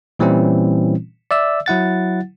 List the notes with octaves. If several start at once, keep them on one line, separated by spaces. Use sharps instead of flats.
A#2 E3 G3 C4 C#4 E4
D5 E5 E6
F#3 E4 F#5 A6